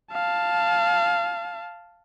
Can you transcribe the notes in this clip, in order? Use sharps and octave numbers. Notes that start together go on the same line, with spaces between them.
F5 A5